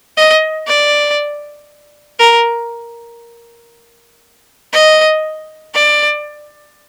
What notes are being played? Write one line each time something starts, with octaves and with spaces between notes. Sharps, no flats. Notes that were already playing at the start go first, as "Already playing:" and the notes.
D#5
D5
A#4
D#5
D5